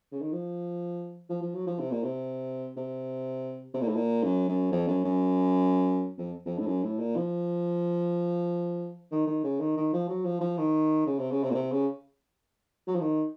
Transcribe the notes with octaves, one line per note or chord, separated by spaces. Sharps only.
C#3
D#3
F3
F3
F3
F#3
F3
C3
A#2
C3
C3
C3
A#2
A2
A#2
F#2
F#2
F2
F#2
F#2
F2
F2
A2
F#2
A2
A#2
F3
D#3
D#3
C#3
D#3
D#3
F3
F#3
F3
F3
D#3
C#3
C3
C#3
C3
A#2
C3
C#3
F#3
F3
D#3